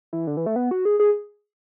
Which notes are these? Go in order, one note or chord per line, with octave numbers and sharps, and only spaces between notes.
E3
D3
E3
A3
B3
F#4
G#4
G#4